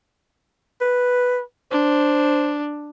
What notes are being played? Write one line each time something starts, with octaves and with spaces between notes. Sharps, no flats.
B4
D4 C5